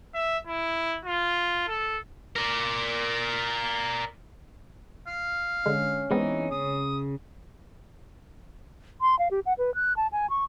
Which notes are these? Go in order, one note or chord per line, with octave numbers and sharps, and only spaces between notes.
E5
E4
F4
A4
A#4 D5
F5
D3 G#3 C#4
E3 G#3 B3 C4 D#4
C#3 D#6
C6
F5
G4
F#5
B4
F#6
A5
G#5
C#6